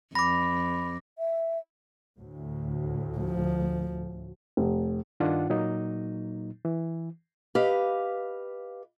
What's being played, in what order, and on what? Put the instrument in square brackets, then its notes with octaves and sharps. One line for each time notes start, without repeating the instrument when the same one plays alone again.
[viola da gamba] F2 [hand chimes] B5 [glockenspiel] D6 A#6
[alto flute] E5
[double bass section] D2 A2
[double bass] F3
[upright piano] F1
[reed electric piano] G2 D#3 D4 F4 F#5
A#2 F#3 A#3 D#4
E3
[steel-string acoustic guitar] G4 B4 D#5 F5